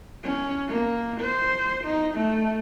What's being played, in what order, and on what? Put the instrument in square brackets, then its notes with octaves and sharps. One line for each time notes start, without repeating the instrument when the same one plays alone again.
[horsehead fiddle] C#4
A#3
C5
D#4
A3